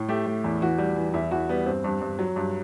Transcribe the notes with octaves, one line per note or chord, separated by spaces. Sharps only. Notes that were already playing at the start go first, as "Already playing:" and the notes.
Already playing: A2
A3 G4
A3
E2
E3 F#4
G3
E3
E2 E4
E2 F#4
G3 B3
G2 C4
G2
G2
F#3
G2